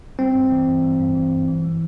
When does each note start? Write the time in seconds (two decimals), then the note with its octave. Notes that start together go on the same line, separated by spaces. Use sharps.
0.19 G3 C4
0.35 G2
0.52 E3
0.68 G2
0.84 G3
1.00 G2
1.15 E3
1.32 G2
1.48 E3
1.64 G3